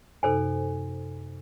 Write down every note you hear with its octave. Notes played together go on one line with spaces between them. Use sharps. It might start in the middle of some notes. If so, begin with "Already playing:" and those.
F#2 C3 D#4 A4 C5 G#5